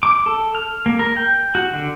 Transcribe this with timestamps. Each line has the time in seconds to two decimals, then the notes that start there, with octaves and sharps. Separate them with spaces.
0.03 D6
0.26 A4
0.55 F6
0.86 A#3
0.99 A#4
1.16 G5
1.55 F#4
1.74 D3